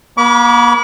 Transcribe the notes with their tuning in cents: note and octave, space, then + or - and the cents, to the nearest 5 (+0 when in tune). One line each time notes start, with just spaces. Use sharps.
A#3 +45 B5 -20 D6 -40